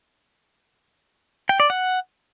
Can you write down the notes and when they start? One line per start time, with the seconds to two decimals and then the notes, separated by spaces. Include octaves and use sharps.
1.49 G5
1.60 D5
1.70 F#5